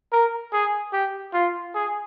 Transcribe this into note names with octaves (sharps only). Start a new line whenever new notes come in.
A#4
G#4
G4
F4
G#4